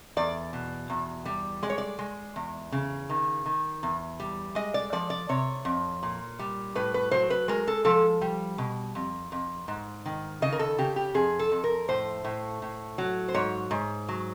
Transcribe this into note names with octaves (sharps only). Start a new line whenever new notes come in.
E2 D5
B2
E2
G3
G#3 D5
C#5
D5
G#3
E2
C#3
D#3
D#3
E2
G3
G#3 D#5
D5
F3 D5
D5
C3 C#5
F2
A#2
G3
A2 B4
B4
F#3 C5
B4
G#3 A#4
A4
F3 A4
G3
B2
F2
F2
G#2
D#3
C#3 D#5
A#4
A4
C#3 G4
G4
F2 G#4
A4
F2
A#4
A2 C5
A2
A2
F#3
C5
G#2 C#5
G#2
F#3